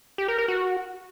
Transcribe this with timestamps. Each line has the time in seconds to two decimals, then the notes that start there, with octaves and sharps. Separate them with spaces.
0.18 G4
0.28 A#4
0.38 A#4
0.48 F#4